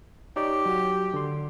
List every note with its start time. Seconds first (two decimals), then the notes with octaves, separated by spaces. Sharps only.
0.36 D#4 G4 C#5 D5
0.66 F#3 F#4
1.14 D3 C6